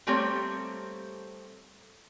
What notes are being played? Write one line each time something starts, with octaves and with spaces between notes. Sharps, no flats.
G3 A3 A#3 C4 G4 C#5